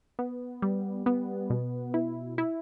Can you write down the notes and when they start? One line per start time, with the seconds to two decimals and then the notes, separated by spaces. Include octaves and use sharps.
0.19 B3
0.62 G3
1.06 B3
1.50 B2
1.94 E4
2.38 E4